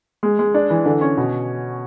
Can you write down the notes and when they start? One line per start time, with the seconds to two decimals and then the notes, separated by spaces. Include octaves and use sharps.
0.23 G#3
0.39 G#3
0.54 D4
0.70 E3
0.86 D3
1.01 C#4
1.17 B2